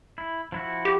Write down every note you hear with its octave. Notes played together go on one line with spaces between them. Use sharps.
E4
F3 E4 F#4
G4